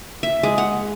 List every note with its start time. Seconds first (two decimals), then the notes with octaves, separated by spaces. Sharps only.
0.23 E5
0.43 G#3
0.58 F#5